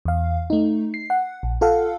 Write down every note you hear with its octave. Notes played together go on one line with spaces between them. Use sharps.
E2 F5
A3 D#4
C7
F#5
A#1
F4 A4 F5 F#5